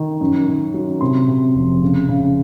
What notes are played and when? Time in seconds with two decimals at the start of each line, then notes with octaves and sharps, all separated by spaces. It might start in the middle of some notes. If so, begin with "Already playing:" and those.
Already playing: D#3
0.21 F#2
0.48 D#3
0.74 F#3
1.01 C3 C6
1.28 C3
1.55 F1
1.82 C#3
2.09 C#3